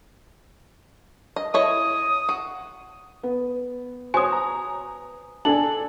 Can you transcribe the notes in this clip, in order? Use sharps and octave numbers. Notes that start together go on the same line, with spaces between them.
D#5
E4 C#5 D#5 D#6
F#4
B3
F#4 C5 C#5 G#5 D#6
A#5
D4 A4 G#5 A5 F#7